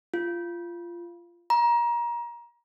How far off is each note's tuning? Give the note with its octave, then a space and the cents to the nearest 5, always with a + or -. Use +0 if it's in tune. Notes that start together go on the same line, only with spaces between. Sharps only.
F4 -15
A#5 +25